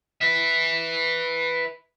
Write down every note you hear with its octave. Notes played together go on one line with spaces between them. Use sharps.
B4 E5